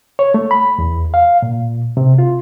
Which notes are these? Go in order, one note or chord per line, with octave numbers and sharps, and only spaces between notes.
C#5
A3
B5
E2
F5
A#2
C3
F4